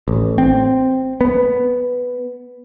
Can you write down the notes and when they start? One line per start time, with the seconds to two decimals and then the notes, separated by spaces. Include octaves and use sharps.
0.08 A1
0.38 C4
1.21 B3